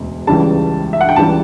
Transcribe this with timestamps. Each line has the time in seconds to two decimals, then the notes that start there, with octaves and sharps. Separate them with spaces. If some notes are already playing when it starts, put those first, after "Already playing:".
Already playing: E1 D2 C#3
0.27 C#2 C#3 E3 G3 A5
0.93 E5
1.01 F#5
1.09 G5
1.16 C#2 C#3 E3 G3 A5